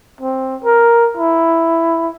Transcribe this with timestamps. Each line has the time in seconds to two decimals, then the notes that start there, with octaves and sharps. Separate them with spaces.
0.21 C4
0.64 A#4
1.17 E4